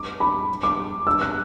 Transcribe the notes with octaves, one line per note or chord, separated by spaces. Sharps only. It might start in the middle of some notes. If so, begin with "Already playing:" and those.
Already playing: D6
B5
D6
E6
F#6